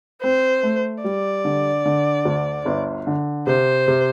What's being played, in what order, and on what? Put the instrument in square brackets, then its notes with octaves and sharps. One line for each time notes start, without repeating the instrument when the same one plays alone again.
[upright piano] C4 [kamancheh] C5
[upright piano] A3
[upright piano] G3 [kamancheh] D5
[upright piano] D3
D3
D2
G1
D3
[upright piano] C3 [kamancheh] C5
[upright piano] C3